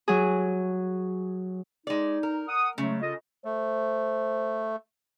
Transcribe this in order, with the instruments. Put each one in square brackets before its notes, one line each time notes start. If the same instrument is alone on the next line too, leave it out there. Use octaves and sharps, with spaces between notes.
[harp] F#3 G#4
[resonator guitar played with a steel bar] G#3 D5 [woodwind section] D#4
[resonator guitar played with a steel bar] A#4
[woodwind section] F#5 D#6
[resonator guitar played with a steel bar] C#3 [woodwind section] F#3 G#3 A3
[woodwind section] F4 A4 D#5
[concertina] A3 [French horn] C5